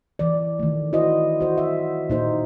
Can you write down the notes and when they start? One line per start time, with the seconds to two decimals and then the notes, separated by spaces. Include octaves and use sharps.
0.19 E3 D5
0.59 D#3 A3
0.93 E4 F#4 C5 D#5
1.40 F#4 C5
1.58 E5
2.10 A#2 D#4 C5